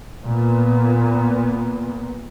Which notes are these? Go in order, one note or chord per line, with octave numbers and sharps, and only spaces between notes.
A#2 B3